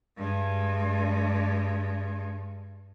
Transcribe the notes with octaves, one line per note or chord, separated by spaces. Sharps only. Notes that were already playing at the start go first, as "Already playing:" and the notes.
G2 G#3